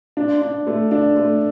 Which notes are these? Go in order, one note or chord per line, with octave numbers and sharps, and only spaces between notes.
D4
D4
A3
D4
A3